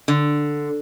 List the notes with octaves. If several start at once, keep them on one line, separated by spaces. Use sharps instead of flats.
D3